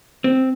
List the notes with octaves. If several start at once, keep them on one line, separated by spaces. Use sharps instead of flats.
C4